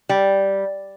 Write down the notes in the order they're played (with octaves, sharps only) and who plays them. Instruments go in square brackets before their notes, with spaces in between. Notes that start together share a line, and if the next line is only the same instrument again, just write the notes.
[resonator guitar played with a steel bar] G3